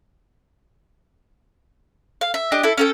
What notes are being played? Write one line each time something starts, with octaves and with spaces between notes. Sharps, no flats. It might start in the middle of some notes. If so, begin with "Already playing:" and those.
F5
E5
D4 G4 D#5
E4 A4
C#4 A4 G5